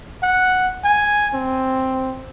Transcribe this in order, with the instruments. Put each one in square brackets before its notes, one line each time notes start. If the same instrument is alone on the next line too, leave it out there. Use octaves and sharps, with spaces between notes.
[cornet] F#5
G#5
C4